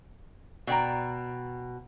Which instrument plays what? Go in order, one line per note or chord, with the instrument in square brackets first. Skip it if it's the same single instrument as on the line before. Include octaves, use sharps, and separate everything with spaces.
[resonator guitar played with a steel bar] B2 D5 G5 A#5